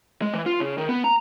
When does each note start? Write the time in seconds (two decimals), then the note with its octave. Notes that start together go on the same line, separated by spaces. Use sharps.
0.22 G#3
0.34 E3
0.46 F4
0.60 C#3
0.78 D#3
0.89 B3
1.04 A#5